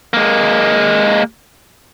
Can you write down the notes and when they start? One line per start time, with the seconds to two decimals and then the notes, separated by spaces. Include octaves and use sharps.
0.14 G#3 A#3